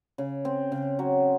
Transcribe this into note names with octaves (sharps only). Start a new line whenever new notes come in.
C#3
C4
C#3
F#3